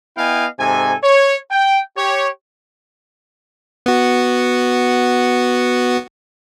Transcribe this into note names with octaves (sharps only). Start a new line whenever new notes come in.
B3 E4 D#5 F5 G5 G#5
G#2 C3 A4 G#5
C#5
G5
G4 C#5
B3 F#4